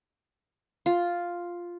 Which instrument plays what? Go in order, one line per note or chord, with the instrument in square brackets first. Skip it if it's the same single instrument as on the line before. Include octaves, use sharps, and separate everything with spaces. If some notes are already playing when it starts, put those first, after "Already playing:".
[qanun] F4